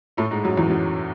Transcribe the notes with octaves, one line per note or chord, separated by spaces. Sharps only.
A2 A3
G#2 G#3
F#2 F#3
E2 E3
F#2 F#3